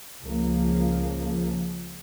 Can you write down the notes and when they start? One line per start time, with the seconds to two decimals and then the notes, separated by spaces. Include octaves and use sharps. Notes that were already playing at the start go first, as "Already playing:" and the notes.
0.23 C#2 C#3 F3 A#3